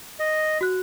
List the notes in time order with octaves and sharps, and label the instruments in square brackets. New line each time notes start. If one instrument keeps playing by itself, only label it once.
[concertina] D#5
[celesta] F#4 F#6